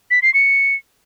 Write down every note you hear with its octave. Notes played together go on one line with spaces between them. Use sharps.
B6
C7
C#7